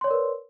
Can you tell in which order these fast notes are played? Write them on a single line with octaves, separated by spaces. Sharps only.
C6 C#5 D5 A#4 B4